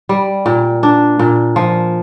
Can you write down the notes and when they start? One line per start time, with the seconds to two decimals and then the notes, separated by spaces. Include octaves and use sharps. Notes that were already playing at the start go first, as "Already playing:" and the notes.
0.09 G3
0.46 A#2
0.83 D4
1.19 A#2
1.56 F3